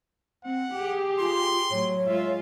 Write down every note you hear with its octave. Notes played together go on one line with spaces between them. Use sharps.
C4 F#5
G4 G#4
F4 C6
A2 F#3 C#5
G#3 F4 E5